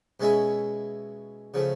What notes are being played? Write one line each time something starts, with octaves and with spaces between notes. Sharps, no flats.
B2 G#3 C#4 E4 G#4
C#3 F3 A3